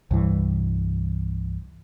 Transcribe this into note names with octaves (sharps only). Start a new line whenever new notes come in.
C2 G2 E3